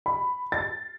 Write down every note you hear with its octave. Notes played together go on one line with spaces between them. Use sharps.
B5
A6